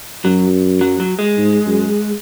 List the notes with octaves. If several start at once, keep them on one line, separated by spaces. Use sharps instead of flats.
F#2 F#3
F#3
F#3
G#3
G#2
F#2